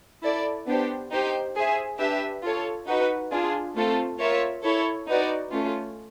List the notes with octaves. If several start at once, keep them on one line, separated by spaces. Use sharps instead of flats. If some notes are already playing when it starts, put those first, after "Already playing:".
E4 A4 D5
B3 D4 G4 C5
D#4 G4 C5
G#4 C5 E5
D4 G4 B4 E5
F4 A4 C#5
D#4 F#4 B4
D4 F4 G#4
A3 C4 F4 A4
F4 A#4 C#5 E5
E4 A4 C#5
D#4 F#4 B4 D5
A3 C#4 F4